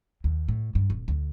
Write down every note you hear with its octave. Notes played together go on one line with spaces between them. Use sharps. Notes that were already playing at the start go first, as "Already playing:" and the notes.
D#2
A2
G2
D#1
D2